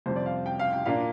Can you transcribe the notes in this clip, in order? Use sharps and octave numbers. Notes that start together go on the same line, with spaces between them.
F2 C3 G3 C5
D5
F5
G5
F5
G5
A#2 A#3 D4 F5